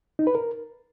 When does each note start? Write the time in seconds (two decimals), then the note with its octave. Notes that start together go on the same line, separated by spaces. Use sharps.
0.19 D#4
0.27 B4
0.35 A#4